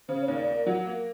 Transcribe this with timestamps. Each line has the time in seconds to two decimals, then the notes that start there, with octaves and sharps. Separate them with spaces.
0.09 C#3 C5
0.21 C#5
0.28 D#2
0.35 D5
0.48 A#3
0.66 F#3
0.86 A#3